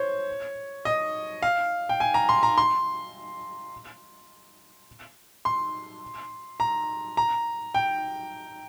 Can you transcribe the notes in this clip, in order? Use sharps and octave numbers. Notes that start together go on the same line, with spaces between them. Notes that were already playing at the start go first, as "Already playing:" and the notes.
Already playing: C5 C#5
D#5
F5
G5
G#5
A#5
C6
A#5
C6
C6
A#5
A#5
G5